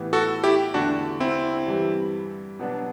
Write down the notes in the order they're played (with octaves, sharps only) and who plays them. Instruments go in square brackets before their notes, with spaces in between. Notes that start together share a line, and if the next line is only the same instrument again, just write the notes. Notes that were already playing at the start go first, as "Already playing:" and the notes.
Already playing: [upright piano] A2 E3 B3 E4 G4
[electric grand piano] F#4 A4
E4 G4
[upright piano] E2 D3 A3 E4 G4 [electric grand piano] D4 F#4
[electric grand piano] C4 E4
[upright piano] G2 E3 G3
B2 F#3 B3 D4